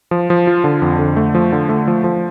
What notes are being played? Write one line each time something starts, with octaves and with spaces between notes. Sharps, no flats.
F3
F3
F4
D3
F2
D3
A3
F3
D3
A3
F3
F3